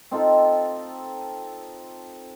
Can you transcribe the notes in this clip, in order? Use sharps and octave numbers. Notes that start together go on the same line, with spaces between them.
C4 D#4 F4 A4